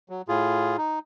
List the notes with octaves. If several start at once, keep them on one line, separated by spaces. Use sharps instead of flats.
F#3
A2 F4 G#4
D#4